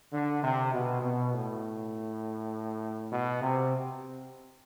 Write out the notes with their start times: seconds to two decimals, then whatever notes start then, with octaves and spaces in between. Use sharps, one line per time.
0.12 D3
0.43 C3
0.73 B2
1.02 B2
1.32 A2
3.11 B2
3.41 C3